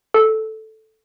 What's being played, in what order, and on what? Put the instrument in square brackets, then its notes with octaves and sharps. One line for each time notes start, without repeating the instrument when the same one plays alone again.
[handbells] A4